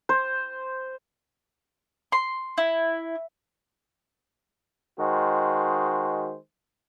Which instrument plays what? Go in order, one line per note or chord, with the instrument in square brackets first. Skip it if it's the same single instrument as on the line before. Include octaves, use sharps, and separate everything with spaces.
[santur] C5
[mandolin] C6
E4
[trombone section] D#3 G#3 F#4 C5